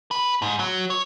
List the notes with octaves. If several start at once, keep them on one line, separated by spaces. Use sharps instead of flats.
B4
G#2
F#3
C#5